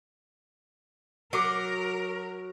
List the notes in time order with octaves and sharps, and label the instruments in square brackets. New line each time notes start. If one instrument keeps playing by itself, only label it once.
[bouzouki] F#3 [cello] A#4 [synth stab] D6 C7 D7